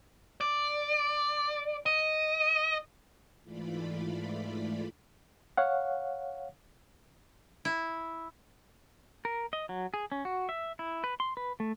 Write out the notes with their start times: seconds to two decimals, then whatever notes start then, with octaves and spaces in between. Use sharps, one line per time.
0.41 D5
1.86 D#5
3.43 G#2 E3 A3 F4 D5 B5
5.57 C#5 F5 F#5
7.65 E4
9.25 A#4
9.53 D#5
9.69 F#3
9.94 G#4
10.12 C#4
10.25 F#4
10.49 E5
10.79 E4
11.04 B4
11.20 C6
11.37 B4
11.60 A3